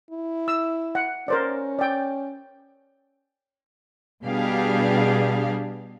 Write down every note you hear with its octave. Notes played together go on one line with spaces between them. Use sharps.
E4
E6
F#5
C#4 A#4 C5 D5
D5 G5
B2 G3 D4 G4 G#4 F5